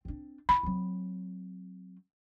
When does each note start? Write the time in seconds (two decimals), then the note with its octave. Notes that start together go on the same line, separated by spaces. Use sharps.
0.05 C4 D4
0.49 E4 B5
0.63 F#3 C4